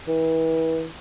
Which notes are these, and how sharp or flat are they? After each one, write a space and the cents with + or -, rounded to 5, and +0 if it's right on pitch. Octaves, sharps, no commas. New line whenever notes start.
E3 -30